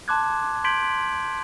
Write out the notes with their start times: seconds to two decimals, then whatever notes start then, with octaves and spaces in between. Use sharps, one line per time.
0.08 A5 C6 D6 F#6 G#6
0.64 C6 G6 G#6 B6 D7 F#7